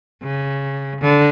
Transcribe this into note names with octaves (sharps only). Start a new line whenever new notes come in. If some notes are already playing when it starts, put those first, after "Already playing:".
C#3
D3